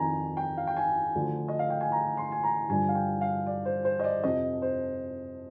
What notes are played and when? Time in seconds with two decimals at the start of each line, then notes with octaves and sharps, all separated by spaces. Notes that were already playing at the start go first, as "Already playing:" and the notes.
Already playing: F2 D#3 G#5 A#5
0.37 G5
0.57 F5
0.67 G5
0.76 G#5
1.15 D2 D3 F3
1.48 D#5
1.59 F5
1.70 G5
1.81 G#5
1.92 A#5
2.17 C6
2.32 G#5
2.43 A#5
2.69 G2 D3 F3 G#5
2.89 F5
2.95 G5
3.21 F5
3.46 D5
3.65 C5
3.85 C5
3.99 D#5
4.04 D5
4.23 F2 C3 F3 D#5
4.62 C5